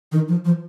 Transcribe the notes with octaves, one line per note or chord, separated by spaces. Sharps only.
D#3
F3
F3